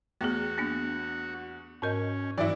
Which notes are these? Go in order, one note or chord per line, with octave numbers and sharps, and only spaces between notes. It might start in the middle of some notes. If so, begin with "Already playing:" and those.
E2 A3 B3 F#4 G#4
A#3 B3 D4
G#2 C#4 A#4 D#5
G2 E3 F#3 E4 D5